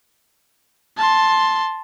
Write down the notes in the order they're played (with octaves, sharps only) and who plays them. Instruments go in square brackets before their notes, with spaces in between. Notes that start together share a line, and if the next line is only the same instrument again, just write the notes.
[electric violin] A5 C6